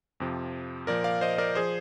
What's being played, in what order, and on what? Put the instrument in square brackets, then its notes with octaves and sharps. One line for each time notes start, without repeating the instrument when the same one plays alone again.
[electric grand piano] F2 C3 F3
A#2 F3 A#4 D5
D5 F5
C5 D#5
A#4 D5
F3 G#4 C5